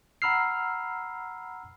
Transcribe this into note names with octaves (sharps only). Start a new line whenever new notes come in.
F#5 A#5 B5 E6 F6 C7